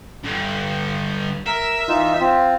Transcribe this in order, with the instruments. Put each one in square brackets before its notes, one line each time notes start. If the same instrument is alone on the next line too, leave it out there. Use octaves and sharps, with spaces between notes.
[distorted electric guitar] G2 D3
[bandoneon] A#4 [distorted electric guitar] E5
[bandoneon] E3 D#4 F4
C4 F4